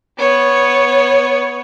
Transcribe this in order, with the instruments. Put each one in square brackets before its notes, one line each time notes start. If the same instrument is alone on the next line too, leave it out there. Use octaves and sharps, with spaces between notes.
[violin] B3 C#5